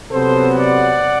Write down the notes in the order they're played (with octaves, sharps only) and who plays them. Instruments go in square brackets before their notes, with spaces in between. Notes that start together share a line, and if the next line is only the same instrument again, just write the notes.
[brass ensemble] C3 F#3 B3 A4 C5
D5 F#5